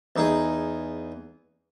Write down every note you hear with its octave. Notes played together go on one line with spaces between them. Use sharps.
E2 D#4 G#4